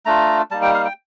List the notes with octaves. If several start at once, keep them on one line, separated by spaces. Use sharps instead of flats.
A3 D4 F4 A#5
G3 A#3 D#4 A5
G5
F5
G5